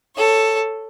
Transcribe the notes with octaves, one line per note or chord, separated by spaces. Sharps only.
A4 C#5